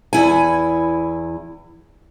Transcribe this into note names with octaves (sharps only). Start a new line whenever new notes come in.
E2 E4 G#5